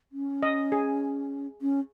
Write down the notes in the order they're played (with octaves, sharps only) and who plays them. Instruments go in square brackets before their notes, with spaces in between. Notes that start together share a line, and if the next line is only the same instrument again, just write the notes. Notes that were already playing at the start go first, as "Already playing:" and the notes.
[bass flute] C#4
[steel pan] D#5
G#4
[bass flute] C#4